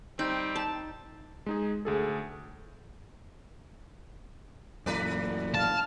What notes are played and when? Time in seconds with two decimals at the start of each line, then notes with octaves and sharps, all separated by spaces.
0.19 G3 C4 D#4
0.56 A5
1.46 G#3 D#4 G#4
1.85 D2 G#4 A4
4.86 F#2 A#2 E3 A3 B4 D5
5.55 F5 A5 F6